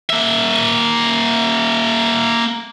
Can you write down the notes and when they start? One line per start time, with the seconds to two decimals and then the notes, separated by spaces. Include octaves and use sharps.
0.10 A#3 E5